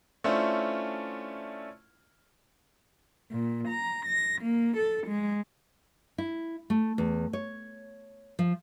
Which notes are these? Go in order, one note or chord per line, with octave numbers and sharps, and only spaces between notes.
A3 C#4 D4 E4 F4 C5
A#2
A#5
A#6
A#3
A4
G#3
E4
A3
E2
C#5
F3